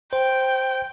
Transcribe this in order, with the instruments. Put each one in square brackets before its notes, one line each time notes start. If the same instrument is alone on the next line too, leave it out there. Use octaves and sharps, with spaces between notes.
[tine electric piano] C5 [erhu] G5